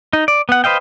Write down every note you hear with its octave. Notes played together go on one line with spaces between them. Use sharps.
D#4
D5
B3 F#5
B4 C5 D#5 F5 G5